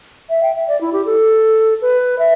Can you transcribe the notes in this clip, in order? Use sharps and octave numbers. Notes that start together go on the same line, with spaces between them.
E5
G5
E5
D5
E4
G4
A4
B4
E5